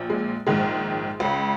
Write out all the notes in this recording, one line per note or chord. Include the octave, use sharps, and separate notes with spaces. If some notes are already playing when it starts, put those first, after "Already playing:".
Already playing: A#1 A#2
G#3
A#1 G#2 D#3 G#3
C#2 C#3